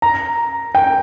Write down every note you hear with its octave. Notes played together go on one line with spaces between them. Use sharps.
A#5
G5